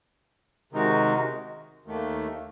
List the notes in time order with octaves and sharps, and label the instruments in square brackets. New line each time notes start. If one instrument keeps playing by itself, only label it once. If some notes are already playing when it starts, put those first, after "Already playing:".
[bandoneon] C3 D#3 G#3 D#4 F#4
D#2 D#3 A3